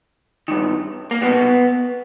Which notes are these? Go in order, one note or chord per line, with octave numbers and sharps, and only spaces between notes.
G2 D#3
A#3
C2 B2 B3